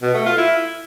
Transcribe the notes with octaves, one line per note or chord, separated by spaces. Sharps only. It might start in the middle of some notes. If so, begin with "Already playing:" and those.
B2
A3
F4
E4